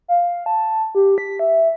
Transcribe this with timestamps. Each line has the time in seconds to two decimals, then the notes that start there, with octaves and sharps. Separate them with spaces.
0.08 F5
0.46 A5
0.95 G4
1.18 B6
1.39 E5